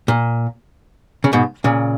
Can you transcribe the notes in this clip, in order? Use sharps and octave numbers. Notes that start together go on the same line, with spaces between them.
A#2
C#3
G#2 B2
A#2 C#3